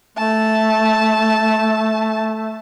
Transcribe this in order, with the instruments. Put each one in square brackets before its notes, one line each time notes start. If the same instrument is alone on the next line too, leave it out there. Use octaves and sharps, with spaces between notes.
[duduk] A3 [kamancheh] A5